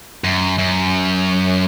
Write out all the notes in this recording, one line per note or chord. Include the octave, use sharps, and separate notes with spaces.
F#2
F#2